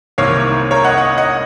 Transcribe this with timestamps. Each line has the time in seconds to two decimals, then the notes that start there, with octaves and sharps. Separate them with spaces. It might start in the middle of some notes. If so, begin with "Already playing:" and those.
0.18 C2 C3 D#3 A#3 C#5 F5
0.71 A#4 C#5
0.84 D#5 F#5
0.98 D#5 F#5
1.18 D#5 F#5